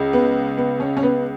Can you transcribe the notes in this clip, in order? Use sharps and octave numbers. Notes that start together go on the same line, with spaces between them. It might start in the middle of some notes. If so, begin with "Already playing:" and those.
Already playing: C#2 C#3
B3
B3
C#4
C#4
B3